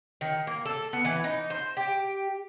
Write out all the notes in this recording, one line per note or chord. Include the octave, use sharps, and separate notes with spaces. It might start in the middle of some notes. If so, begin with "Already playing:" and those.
D#3
A#3
A4
B3
E3
D#4
C5
G4